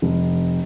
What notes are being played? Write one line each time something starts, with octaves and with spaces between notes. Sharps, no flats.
F1